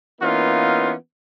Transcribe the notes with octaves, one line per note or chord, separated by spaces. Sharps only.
E3 A#3 B3 C#4 D#4 F4